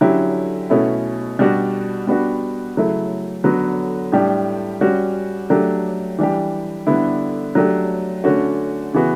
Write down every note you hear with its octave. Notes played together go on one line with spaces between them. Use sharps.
D3 F#3 C#4 E4 G4
B2 A3 C#4 E4
B2 G3 D4 F#4
G3 B3 D4 F#4
C#3 F#3 A3 E4
D3 F#3 B3 F#4
A2 G3 D4 G4
G3 C#4 F#4
F#3 A3 D4 G4
E3 G3 D4 G4
D3 G3 B3 E4
F#3 A3 D4 G4
D3 A3 C#4 F#4
C#3 E3 B3 F#4